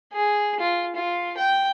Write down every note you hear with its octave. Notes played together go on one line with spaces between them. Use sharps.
G#4
F4
F4
G5